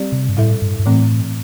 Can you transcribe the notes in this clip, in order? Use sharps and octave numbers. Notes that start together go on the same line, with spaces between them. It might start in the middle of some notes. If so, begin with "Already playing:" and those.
Already playing: G3 C4 G4 D5
C3
G2
A2 G3 E4 A4 E5
G2
G2
A2 E3 A3 C4